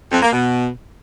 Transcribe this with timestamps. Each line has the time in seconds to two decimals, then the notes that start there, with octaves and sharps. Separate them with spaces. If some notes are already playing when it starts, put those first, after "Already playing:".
0.12 F2
0.22 A#3
0.32 B2